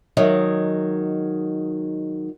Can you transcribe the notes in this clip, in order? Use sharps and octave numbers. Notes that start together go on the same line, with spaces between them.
D#3 F#3 G#3